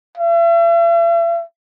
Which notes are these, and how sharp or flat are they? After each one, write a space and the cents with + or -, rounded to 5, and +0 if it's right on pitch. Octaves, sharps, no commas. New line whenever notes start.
E5 +45